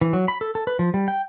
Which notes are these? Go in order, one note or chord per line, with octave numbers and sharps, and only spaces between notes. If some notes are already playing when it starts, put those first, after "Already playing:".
E3
F#3
B5
A4
A4
B4
F3
G3
G5